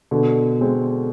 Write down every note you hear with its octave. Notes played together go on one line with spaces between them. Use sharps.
B2 D3
G#3 C4